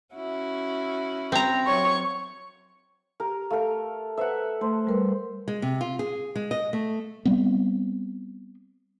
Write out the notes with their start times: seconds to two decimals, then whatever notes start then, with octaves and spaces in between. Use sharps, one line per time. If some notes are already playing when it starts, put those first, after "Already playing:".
0.14 C#4 E4 F#4
1.32 C4 A#5
1.67 F#3 C#5 C#6
3.20 G4 A#4
3.51 A3 A#4 F5
4.18 B4 C5 E5 F#5
4.61 A3 C5
4.87 G3 A#4 B4
5.48 G#3
5.62 C3
5.81 F4
5.99 G#4
6.36 G#3
6.51 D#5
6.73 A3
7.25 G3 B3 C4